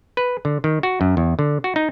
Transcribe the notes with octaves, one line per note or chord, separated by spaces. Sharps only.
B4
D3
D#3
F#4
F#2
E2
D3
F#4
D#4